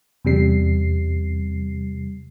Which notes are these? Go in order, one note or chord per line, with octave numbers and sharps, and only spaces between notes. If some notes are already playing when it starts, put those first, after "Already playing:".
E2 C3 G3 C7